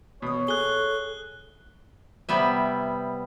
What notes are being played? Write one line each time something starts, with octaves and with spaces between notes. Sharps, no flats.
B2 C#5 D#6
G#4 A4 F#6 G7
C3 G3 B3 E5